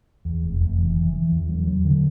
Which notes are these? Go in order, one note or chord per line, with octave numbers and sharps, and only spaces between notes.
E2
F1
F1
E3
E3
E3
E2
F#3
F#3
D3